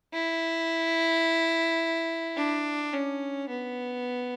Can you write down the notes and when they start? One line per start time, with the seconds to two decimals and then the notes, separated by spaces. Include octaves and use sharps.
0.14 E4
2.37 D4
2.93 C#4
3.49 B3